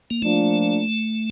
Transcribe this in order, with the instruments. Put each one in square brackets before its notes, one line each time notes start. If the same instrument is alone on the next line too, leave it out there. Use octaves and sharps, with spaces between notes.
[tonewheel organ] A#3
[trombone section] F3 A#3 D4 F4 [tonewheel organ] A3